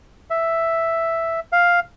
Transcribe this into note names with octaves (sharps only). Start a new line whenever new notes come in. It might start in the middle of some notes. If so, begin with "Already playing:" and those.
E5
F5